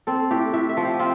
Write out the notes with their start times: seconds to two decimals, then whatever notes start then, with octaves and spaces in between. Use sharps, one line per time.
0.07 C4 A4
0.31 A2 G4
0.54 A2 E5
0.69 E5
0.77 F3
0.84 G4
0.99 C4 F4